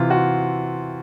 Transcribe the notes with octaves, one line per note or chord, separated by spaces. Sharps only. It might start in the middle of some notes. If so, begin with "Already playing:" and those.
Already playing: C3 E3 F4
F#4